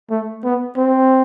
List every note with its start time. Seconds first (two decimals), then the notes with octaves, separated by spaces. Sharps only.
0.11 A3
0.44 B3
0.77 C4